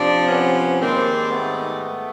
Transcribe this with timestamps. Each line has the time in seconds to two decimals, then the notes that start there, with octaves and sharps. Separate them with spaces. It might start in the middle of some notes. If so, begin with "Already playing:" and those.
Already playing: C3 F3 C4 D4
0.28 B3 C#4
0.80 G#2 D#3 G3 A#3 C4
1.31 A3 B3